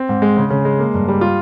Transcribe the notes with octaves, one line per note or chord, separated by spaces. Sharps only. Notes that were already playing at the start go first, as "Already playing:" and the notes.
Already playing: C4
G#2
G#3
C#3
C#3
G#3
A#3
G2
G3
F4